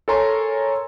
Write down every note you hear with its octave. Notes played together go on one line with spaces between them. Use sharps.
A4 A#4 C#5 G#5 A#5 C6